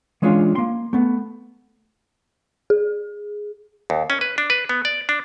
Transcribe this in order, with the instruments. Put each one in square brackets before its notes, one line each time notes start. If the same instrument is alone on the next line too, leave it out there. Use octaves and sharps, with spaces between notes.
[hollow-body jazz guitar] E3 G#3 C#4 D4 F4
A#3 C6
A3 B3
[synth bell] G#4
[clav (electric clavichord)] D#2
C#4
B4
D4
B4
B3
D5
D4